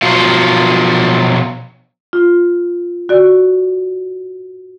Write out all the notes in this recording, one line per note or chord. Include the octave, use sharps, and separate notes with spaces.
B2 F3 F#3 F4
F4
F#4 D5